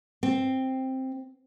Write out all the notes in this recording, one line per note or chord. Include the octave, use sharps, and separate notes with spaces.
C4